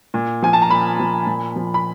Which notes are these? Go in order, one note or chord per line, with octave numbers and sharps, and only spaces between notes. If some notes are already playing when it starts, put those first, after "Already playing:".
A#2
F3 G#5
A5
A#5
A#2 B5
F3
A#2
F3
B5